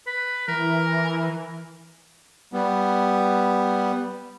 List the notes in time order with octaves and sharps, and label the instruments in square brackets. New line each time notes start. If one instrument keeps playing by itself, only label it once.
[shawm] B4
[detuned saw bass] E3 [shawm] A#4
[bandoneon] G3 B3